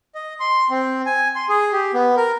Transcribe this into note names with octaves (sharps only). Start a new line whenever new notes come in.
D#5
C6
C4
G#5
C6
G#4
G4
B3
A#4